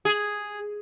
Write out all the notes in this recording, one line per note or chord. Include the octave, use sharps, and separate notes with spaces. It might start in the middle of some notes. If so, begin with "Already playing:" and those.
G#4